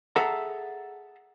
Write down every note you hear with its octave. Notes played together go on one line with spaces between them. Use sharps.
G#4 A4 E5 F#5 A5 A#5